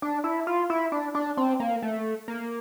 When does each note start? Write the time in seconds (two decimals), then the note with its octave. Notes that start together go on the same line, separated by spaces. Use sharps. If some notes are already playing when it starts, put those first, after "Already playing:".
0.02 D4
0.24 E4
0.47 F4
0.70 E4
0.92 D4
1.15 D4
1.37 C4
1.60 A#3
1.82 A3
2.28 A#3